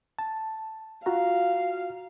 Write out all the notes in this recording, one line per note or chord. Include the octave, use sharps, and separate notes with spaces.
A5
F4 F#4 F5 A#5